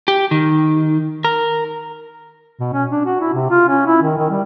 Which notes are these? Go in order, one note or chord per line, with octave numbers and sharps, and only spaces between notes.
G4
D#3
A#4
B2
C#4
D4
F#4
E4
C3
F4
C#4
E4
D#3
D#3
G3